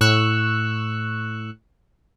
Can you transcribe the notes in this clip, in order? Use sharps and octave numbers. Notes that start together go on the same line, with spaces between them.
A2 C#6 E6 F#6